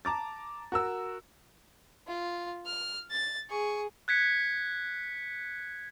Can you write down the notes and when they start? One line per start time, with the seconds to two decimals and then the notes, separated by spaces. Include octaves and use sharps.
0.05 A5 A#5 D6 A6
0.72 F#4 A#4 E6
2.07 F4
2.66 F6
3.11 A6
3.49 G#4 C#6
4.08 F#6 G#6 B6 C#7